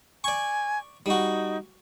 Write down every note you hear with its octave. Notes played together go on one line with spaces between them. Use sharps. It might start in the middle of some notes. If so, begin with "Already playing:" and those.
D5 G#5 C#6
G3 D#4 F#4